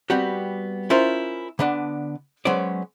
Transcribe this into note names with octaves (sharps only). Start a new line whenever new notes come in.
G3 B3 C4 F#4 G4
C#4 E4 F4 A#4 C5
D3 B3 D4
F#3 G#3 B3 C#4 C5 D5